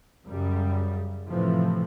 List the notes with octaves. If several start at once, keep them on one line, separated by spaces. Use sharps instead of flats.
F#2 C#3 G3
A2 C3 E3 F3 A3